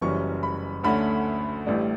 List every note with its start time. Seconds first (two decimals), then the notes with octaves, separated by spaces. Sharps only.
0.01 F#1 F#2 E3 G3 C#4 C#6
0.43 B5
0.84 D2 D3 A3 C#4 B5
1.66 A1 A2 G3 D4